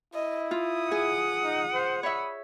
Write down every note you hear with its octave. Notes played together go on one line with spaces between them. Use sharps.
E4 D#5
F4 D#6
G#4 F#5
D#4
C5
C#5 E5 B5